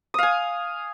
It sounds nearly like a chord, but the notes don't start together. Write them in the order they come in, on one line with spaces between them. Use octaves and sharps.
D#6 F5 G#5